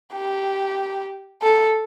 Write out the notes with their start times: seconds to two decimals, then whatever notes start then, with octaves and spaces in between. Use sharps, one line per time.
0.13 G4
1.43 A4